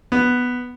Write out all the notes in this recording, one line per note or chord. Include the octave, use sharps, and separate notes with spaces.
B3